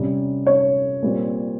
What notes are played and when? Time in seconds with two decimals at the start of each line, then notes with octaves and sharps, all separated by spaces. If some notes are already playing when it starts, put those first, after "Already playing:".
Already playing: C3 G3 C#4
0.46 C#5
1.02 A#2 G3 C4